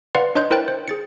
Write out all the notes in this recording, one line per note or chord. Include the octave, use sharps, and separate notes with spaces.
B4 D5 F5 F#5 C6
D4 C#5 D#5 C6 F#6 G6
E4 A#4 C5 G5 F#6 A6
C5
G#4 A6 C#7